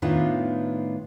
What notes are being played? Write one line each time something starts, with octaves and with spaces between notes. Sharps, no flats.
A2 D#3 B3 D4 F4